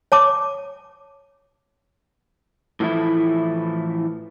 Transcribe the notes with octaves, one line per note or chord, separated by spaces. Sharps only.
C#5 A5 D6
A2 E3 F3 A3 E4